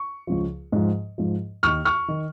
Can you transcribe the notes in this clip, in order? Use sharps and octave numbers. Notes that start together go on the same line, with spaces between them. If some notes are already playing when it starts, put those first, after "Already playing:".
Already playing: C#6
C#2 C#3 F3
G#2 F3
G#2 F3
D#2 D#3 C#6 F6
C#6 F6
D#3